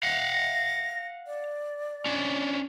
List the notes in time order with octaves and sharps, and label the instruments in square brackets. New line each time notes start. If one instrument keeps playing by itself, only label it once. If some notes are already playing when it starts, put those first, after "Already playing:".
[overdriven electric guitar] F5 F#5 [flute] A#6
[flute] D5
[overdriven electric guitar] C#4 D4